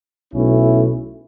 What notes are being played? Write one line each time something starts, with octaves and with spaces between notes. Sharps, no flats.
B1 B2 A3 C#4 E4